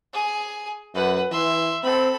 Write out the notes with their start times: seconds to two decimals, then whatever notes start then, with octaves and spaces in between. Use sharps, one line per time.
0.13 G#4 G#5
0.94 F#2 B4 F#5
1.31 E3 E5 C6
1.83 C4 A4 B5